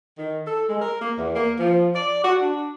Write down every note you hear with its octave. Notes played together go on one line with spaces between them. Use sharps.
D#3
A4
G#3
A#4
A#3
E2
A#3
F3
D5
F#4
D4